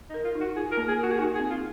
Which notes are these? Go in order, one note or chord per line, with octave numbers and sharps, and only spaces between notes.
D#4
A#4
F4
D#4
F#4
F4 G#4
A#4
A#3
G#4
A#4
F#4
G#4
D#4 F#4
G#4
C4
F4